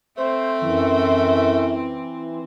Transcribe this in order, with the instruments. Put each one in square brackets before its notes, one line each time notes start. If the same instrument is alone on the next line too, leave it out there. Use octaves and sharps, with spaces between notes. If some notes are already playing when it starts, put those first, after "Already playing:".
[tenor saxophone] A3 [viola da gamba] C4 [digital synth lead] C5
[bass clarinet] F#2 [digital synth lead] E3